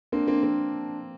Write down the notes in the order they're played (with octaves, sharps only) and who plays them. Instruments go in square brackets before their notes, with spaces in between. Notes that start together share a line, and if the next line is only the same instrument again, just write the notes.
[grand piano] A#3 C4 [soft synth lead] D4
[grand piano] A#3 C4
A#3 C4